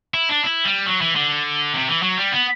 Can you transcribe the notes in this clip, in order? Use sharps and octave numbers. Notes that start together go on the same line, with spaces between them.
E4
D4
E4
G3
F#3
E3
D3
C3
E3
F#3
G3
B3